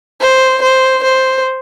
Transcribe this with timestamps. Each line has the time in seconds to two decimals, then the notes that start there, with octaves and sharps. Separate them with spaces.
0.21 C5
0.62 C5
1.03 C5